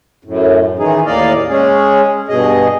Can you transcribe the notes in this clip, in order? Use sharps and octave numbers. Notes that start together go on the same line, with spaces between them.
F#2 A2
D#3 E3 D#4 G#4
D#2 A2 A#3 D5 D#5 F5
G#3 C#4 G#4
G2 B2 G#4 D#5